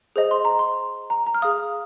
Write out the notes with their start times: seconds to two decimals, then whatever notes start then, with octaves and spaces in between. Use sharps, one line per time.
0.16 G#4 C5 D#5
0.31 C6
0.45 A#5
0.59 C6
1.10 A#5
1.27 A#5
1.34 F6
1.42 G#4 F5 D#6